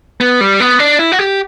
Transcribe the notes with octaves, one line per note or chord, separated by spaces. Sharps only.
B3
G3
B3
D4
E4
F#4
G4